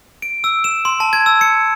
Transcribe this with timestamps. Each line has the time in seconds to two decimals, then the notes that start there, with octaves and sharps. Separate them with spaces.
0.22 D7
0.44 E6
0.64 E7
0.85 C6
1.00 A5
1.13 G#6
1.26 E6
1.41 C#7